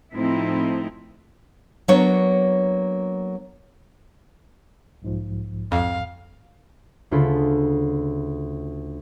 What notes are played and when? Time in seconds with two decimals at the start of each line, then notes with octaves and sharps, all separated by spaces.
0.14 A2 F3 C4 D#4 E4
1.88 F#3 A#3 B3 D4 C#5
5.02 B1 G#2 F3
5.72 F2 F5
7.11 D2 C#3 F4 G#4 A4 B5